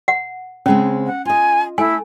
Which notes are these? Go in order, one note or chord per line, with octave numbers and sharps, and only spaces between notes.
F#5
C#3 G#3 C4 C#4
F#5
F4 D#5 G#5
A3 E4 G#5